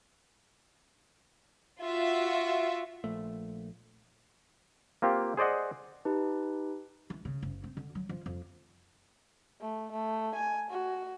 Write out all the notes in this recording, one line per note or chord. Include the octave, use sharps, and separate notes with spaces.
F4 F#4 E5
A#1 A3
A#3 C4 F4 G4
G#4 C5 D5 D#5 F#5
D#4 G4 B4 A5
E3
C#3
F#1
C4
D3
F#3
F3
F2
A3
A3
G#5
F#4